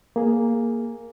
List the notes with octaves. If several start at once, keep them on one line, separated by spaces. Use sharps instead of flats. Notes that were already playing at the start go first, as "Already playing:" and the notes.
A#3 G#4